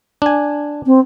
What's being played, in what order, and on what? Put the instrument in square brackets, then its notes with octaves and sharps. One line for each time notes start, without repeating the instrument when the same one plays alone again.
[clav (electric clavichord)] D4 G#5
[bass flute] C4